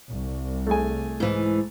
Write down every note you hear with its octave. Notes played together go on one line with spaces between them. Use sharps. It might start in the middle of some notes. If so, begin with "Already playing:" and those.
C2
A3 G#4 G#5
G#2 E3